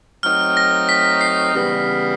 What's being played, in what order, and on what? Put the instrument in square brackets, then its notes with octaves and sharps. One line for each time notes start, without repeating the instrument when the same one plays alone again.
[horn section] F#3 A3 C4 D#4 [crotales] F6
[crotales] A#6
B6
C7
[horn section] C#3 E3 G3 B3